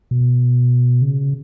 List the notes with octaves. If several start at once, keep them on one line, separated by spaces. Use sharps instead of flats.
B2
C#3